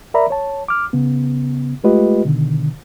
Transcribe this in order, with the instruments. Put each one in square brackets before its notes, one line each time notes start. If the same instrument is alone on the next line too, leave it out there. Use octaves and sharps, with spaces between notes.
[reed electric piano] A#4 D5 E5 A#5 B5
C#5 A5
D6 F6
C#3 B3
G#3 A3 F4 G4 B4 D#5
B2 D3 D#3